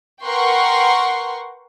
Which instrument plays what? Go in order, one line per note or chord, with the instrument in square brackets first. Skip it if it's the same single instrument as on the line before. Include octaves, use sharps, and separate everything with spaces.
[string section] A#4 B4 F#5 G5 C6 C#6